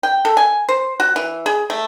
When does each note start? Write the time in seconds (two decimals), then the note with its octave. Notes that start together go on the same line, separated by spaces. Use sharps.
0.03 G5
0.25 A4
0.37 G#5
0.69 C5
1.00 F#4
1.16 E3
1.46 G#4
1.70 A3